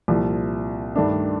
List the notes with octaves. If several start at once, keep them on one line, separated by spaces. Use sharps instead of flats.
C2 A#2 F3
G2 D#3 A3 D4